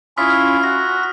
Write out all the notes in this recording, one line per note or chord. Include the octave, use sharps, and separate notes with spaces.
C#4 E4 F4 D#6 F6 B6
F#4 A#6